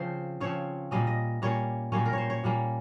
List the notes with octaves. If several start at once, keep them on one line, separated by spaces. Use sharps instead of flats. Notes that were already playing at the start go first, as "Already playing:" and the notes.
Already playing: C#3 F3 C4 C5
C#3 F3 C4 C#5
A#2 G3 A#3 C#4 D#5
D#5
A#2 G3 A#3 C#4 C#5
A#2 G3 A#3 C#4 C#5
A#4
C#5
C5
C#5
A#2 G3 A#3 C#4